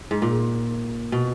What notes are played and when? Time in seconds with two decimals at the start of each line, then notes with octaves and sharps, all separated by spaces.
0.11 G#2
0.22 A#2
1.12 B2